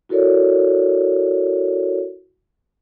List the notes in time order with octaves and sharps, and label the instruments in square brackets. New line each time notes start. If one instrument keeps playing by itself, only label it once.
[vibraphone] E4 F#4 A4 A#4 C#5 D5